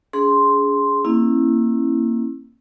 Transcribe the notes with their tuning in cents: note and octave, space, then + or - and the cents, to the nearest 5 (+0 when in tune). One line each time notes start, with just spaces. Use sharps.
D4 -45 G#4 +0 C6 +0
A#3 -10 C#4 -45 E4 +0